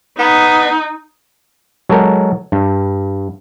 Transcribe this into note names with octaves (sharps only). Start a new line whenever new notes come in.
B3 D#4
F#3 G#3 A4 A#4
G2